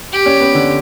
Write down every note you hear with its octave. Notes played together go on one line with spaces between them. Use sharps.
G4
C#4
B3
D3